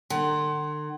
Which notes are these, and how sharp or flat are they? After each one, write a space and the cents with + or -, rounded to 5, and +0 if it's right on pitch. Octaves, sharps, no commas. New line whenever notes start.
D3 +40 F#5 +35